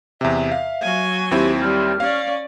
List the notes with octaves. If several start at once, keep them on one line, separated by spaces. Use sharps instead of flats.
E2 C3 E5
F5
F#3 G#5
D#2 C4 E4 G4
G3 F6
C#4 D5 F5